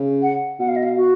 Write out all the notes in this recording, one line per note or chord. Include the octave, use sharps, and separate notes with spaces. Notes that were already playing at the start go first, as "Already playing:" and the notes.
Already playing: C#3
F#5
B2 F#5
F5
D#5
F5
F#4